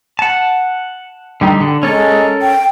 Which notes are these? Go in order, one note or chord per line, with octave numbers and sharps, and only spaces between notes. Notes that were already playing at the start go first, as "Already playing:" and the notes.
F#5 A5
D3 G3 D#4
D3
G#3 C#4 A4 A#4
G5